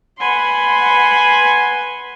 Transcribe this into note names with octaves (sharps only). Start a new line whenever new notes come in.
B4 F#5 G#5 B5 C6